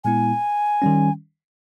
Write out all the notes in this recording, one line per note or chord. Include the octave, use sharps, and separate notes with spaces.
A#2 G#3 B3 E4 G#5
D#3 G3 C#4